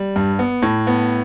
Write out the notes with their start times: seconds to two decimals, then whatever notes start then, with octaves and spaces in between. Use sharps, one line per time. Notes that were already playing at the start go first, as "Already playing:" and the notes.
Already playing: G3
0.16 G2
0.39 B3
0.62 A2
0.87 B3